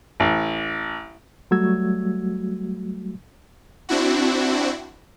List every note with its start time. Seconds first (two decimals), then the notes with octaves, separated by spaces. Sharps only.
0.20 A1
1.51 F#3 G3 A3 F#4 E6 G#6
3.89 C4 D4 E4 F#4